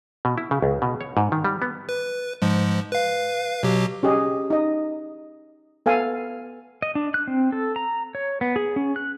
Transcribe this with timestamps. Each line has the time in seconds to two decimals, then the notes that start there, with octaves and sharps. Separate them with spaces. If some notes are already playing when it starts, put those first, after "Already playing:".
0.25 B2
0.38 E4
0.51 C#3
0.62 C#2
0.82 B2
1.01 C#5
1.17 G#2
1.32 D#3
1.44 G3
1.62 B3
1.89 B4
2.42 G#2 F3 G#3
2.92 B4 F5
3.63 B2 F#3 G4
4.03 C#4 G4 G#4 D#5
4.50 D#4 D#5
5.86 B3 A4 F5 G#5
6.82 D#5
6.95 D4
7.14 F#6
7.28 C4
7.52 A4
7.76 A#5
8.15 C#5
8.41 B3
8.56 G#4
8.76 C#4
8.96 F#6